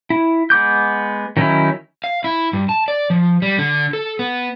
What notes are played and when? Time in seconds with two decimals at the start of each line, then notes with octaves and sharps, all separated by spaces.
0.10 E4
0.50 G#3 B3 D6 G6
1.37 D#3 F#3 C#4 D#4 E4
2.04 F5
2.24 E4
2.53 G2
2.69 A5
2.88 D5
3.10 F3
3.42 G3
3.59 D3
3.93 A4
4.19 B3